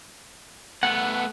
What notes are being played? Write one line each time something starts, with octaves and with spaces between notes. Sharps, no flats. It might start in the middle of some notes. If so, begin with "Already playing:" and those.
A3 B3 F#5